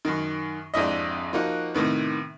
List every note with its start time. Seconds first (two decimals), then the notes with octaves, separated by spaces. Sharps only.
0.05 F#2 D#3
0.74 G#1 F2 D4 E4 D#5
1.33 F3 A#3 D#4 F#4
1.74 A2 C3 D#3 B3